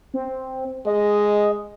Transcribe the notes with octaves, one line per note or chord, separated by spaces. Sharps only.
C4
G#3 D#5